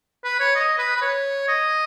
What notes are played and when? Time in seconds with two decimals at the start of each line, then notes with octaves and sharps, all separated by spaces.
0.24 B4
0.40 C#5
0.55 D#5
0.79 B4
0.96 B4
1.02 C#5
1.48 D#5